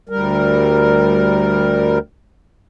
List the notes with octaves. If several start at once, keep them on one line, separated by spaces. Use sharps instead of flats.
D2 G3 A#4